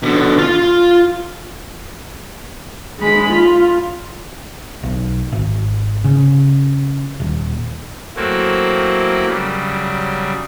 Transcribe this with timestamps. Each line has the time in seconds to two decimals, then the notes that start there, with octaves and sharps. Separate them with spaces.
0.02 B2 D3
0.38 F4 F5
3.00 G#3 B5
3.33 F4
4.83 B1
5.32 G#1
6.04 C#3
7.20 D#1
8.16 F#3 A3 A#3 C4 E4 F#4
9.27 C#3 F#3 G3